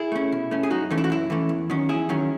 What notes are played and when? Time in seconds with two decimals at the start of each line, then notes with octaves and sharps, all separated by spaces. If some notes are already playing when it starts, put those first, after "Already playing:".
Already playing: E4 G#4
0.12 A3 C#4
0.32 B2
0.51 A3 C#4
0.63 G#4
0.70 F#2 D#4 F#4
0.91 E3 A3 C#4
0.98 E4
1.04 F#4
1.10 F#2 E4
1.30 E3 A3 C#4
1.49 E2
1.70 D#3 F#3 C#4
1.89 E2 E4 G#4
2.09 D#3 F#3 C#4